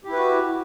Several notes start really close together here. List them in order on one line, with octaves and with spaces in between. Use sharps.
G4 E4 B4 F#4